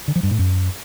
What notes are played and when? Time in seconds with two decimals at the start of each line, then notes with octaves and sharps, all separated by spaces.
0.08 D3
0.16 F3
0.23 G2
0.31 A2
0.39 F#2